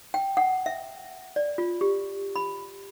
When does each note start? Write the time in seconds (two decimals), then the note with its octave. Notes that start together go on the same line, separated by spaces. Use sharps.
0.14 G5
0.37 F#5
0.66 E5
1.36 D5
1.58 F4
1.81 G4
2.36 B5